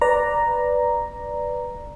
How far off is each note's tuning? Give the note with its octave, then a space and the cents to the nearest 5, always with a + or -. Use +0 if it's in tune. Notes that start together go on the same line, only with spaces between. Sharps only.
B4 +0 D5 +0 A#5 +0